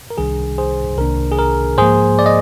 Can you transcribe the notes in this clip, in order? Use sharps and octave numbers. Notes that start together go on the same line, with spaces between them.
A#4
C2 C3 D#3 G3 D4 G#4
G#4 C5
C2 C3 D#3 A#3 D4 A#4
G#4
A#4
G#2 F3 A#3 G#4 C5
D5
D#5